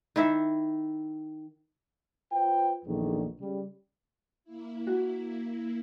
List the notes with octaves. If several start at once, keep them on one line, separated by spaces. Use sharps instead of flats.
D#3 E4 E5
F4 B4 C5 G5
A#1 E2 D3 D#3
C#3 G3
A#3 E4
F#4